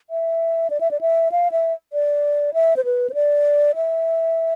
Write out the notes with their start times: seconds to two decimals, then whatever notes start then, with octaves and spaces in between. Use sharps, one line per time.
0.10 E5
0.70 D5
0.81 E5
0.91 D5
1.01 E5
1.32 F5
1.52 E5
1.93 D5
2.54 E5
2.77 C5
2.85 B4
3.10 C5
3.14 D5
3.75 E5